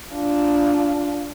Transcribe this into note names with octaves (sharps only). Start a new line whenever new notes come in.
D4 F4